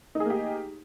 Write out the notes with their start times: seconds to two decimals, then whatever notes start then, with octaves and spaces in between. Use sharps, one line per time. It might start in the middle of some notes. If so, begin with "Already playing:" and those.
0.15 D#4
0.20 G#4
0.25 A#3
0.30 G4